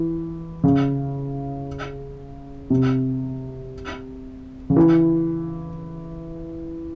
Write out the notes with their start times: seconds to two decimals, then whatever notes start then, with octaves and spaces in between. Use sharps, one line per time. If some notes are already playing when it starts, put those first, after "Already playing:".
Already playing: E3
0.64 C#3
2.70 C3
4.70 C#3
4.76 E3